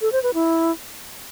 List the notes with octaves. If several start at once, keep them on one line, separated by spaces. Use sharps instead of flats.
A4
C5
B4
E4